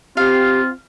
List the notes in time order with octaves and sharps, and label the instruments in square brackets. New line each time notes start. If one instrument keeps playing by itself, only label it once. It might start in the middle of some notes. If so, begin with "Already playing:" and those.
[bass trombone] C4 [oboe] F4 [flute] G4 [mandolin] F5